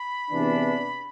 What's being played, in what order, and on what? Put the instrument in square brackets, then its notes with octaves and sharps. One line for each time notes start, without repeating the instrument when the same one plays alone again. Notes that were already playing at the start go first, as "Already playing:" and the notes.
Already playing: [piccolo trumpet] B5
[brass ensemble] E2 C3 E3 B3 D4